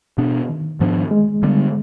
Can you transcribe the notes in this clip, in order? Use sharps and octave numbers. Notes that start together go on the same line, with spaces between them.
B2 B3 D4
D#3
G#2 F3 B3 D4
G#3
D3 G3 B3 D4